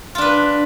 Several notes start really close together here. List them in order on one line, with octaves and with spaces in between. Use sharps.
F4 D4 B4